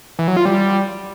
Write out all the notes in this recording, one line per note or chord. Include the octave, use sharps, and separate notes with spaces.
E3
F#3
F4
G3